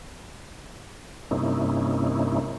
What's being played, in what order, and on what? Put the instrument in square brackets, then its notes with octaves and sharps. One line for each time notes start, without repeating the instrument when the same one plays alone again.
[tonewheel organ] G2 C3 A#3 C#4 D#4 E4